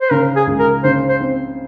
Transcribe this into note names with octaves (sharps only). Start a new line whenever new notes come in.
C5
C#3 A#4
G#4
C#2
A#4
C#3 C5
C5
C4